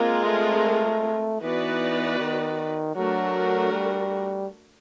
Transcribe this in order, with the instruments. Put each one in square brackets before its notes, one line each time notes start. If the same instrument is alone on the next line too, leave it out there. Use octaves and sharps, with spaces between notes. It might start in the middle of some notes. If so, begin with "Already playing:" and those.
Already playing: [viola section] G#3 C4 F4 A#4 [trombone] A#3
[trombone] A3
[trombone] E3 [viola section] B3 D#4 F#4 B4 D5
[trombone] D#3
[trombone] F#3 [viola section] A3 D4 F#4 A#4
[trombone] G3